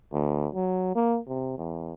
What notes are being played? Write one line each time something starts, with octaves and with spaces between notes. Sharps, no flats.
D2
F#3
A#3
C3
E2